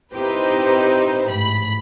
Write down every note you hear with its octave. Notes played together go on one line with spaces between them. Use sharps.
C4 D#4 E4 G4 B4 C5
A1 G#2 B5